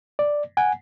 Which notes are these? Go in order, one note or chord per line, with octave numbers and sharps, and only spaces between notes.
D5
F#5 G#5